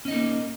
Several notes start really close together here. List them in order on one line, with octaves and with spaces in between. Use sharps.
C#4 D#5 D#4 A#3